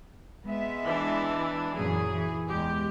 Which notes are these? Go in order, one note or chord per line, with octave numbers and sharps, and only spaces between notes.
G#3 B3 E5
E3 D4
F#2 A#2 E3 G#4
E3
E2 G#3 G4